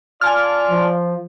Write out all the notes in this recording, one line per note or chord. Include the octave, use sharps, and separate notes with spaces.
F4 D5 G#5 A5 F6
F3